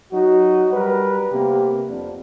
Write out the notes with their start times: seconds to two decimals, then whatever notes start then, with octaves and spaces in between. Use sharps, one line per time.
0.12 F#3 D#4 F#4
0.72 G3 A#4 B4
1.31 C3 A#3 B3 G4
1.89 F2 D4